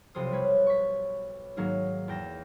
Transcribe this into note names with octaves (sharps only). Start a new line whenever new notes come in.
B1 C3 F3 C5 D#6
G3 B4 C#5
C#6 B6
G#2 D#3 F#3 A#3 D#4
E2 G5 A#6 E7